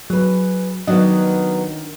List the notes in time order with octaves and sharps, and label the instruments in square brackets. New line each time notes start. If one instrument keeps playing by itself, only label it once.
[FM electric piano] F#3 [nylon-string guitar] G#4 B4
[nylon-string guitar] D#3 D4 [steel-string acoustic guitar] F#3 B3 [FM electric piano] D#5